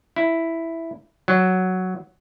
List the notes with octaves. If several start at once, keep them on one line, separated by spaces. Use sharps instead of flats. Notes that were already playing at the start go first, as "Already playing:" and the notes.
E4
F#3